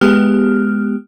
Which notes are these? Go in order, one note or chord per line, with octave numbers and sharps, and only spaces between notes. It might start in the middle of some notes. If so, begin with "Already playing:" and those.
G#3 B3 G4 F6